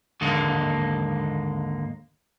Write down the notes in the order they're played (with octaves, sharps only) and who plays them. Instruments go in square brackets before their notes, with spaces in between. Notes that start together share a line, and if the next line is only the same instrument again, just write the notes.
[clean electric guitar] D#2 G#2 D3 G#3 A#3